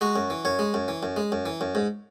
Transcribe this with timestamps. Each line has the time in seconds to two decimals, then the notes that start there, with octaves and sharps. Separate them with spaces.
0.01 G#3 F#4
0.16 F#2
0.30 E3
0.45 F#2 C#5
0.59 G#3
0.74 F#2
0.88 E3
1.03 F#2
1.16 G#3
1.32 F#2
1.46 E3
1.61 F#2
1.75 G#2